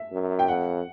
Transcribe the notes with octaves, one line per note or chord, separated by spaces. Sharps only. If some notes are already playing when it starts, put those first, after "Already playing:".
Already playing: E5
F#2
G5
F2 F#5